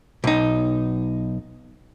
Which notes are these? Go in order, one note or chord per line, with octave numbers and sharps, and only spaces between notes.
B1 D#4